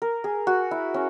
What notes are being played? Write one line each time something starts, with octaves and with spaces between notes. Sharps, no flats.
A#4
G#4
F#4
E4
C#4